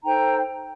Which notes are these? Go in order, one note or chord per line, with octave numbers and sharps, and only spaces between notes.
D#4 A4 C5 G5 A#5